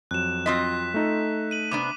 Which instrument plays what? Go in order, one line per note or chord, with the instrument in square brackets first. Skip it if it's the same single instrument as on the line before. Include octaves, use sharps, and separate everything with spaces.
[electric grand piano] F2 F#3 [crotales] F#6 E7
[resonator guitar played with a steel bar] C4 F4 D#5 [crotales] B6
[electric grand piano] A3 D#4 A4
[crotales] D#7 F#7
[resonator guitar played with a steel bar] C3 B3 D4 [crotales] D6